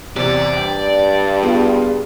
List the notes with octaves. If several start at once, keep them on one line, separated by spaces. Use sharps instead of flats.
E2 C3 D5
G2 G5
B3 F4 G#4